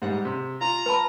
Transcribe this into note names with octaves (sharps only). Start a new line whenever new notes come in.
G#2 G3 F#5
C3
F4 A#5
B4 A5 B5